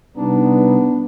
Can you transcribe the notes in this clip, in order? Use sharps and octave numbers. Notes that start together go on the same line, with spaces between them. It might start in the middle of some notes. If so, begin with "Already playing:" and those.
C3 G3 B3 D4 D#4